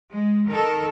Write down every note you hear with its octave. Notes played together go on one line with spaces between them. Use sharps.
G#3
D#3 A4 A#4